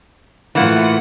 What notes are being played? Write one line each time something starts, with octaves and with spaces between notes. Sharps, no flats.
A2 E3 A#3 F4 F#5